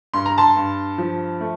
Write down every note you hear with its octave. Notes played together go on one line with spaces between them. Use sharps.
G2 C6
A#5
A5 C6
G2
F3
A3